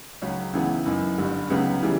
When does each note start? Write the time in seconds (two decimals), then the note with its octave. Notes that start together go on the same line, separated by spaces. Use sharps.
0.22 C#2 C#3 F#3 C#4
0.53 C#2 C#3 E3 B3
0.85 F#1 F#2 E3
1.18 G1 G2 D3
1.50 C#2 C#3 F#3 B3
1.83 C#3 E3 G3